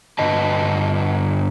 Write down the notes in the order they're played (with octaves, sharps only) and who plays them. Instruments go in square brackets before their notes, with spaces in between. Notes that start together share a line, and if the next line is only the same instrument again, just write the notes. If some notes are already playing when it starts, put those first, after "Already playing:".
[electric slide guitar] G2 D3 B4 D#5 A5